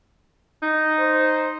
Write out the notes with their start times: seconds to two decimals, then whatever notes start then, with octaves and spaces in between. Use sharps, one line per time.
0.63 D#4
1.00 C5